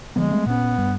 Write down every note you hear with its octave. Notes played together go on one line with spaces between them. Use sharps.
D3 F3 G#3 B3
G3 A3 C4
A#2 B3 C#4
G2